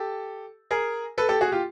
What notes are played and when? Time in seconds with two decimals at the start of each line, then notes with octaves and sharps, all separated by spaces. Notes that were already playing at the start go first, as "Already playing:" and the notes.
Already playing: G4 A4
0.71 G#4 A#4
1.18 A4 B4
1.29 G4 A4
1.41 F#4 G#4
1.52 F4 G4